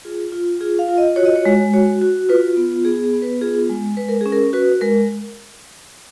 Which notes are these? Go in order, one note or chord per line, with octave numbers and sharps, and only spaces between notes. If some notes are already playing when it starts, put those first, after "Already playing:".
F4 G#4
F4
F4 G#4
F5
F4
D#5
F#4 C#5
D#5
C#5
G#3
F#4 C#5
F#4
F4 B4
B3
B3 G#4
G#4
B3
B4
F4 G#4
G#3
G#3 B4
A#4
C#4 G#4
A#4
F#4 B4
G#3 A#4